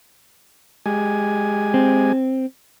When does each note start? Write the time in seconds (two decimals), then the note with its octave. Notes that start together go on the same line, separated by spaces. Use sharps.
0.86 G#3 G4 G#5
1.74 C4